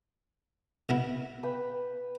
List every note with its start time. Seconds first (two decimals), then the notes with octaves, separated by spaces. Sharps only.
0.89 B2 B3 E4
1.43 B4 G5